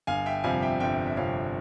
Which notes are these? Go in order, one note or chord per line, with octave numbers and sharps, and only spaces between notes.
G1 F5 G#5
E5 G5
F2 C3 G3 F5 G#5
E5 G5
G1 E5 G5
E5
F2 C3 G3 C#5 F5